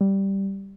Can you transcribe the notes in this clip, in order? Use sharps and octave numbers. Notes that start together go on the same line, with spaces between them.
G3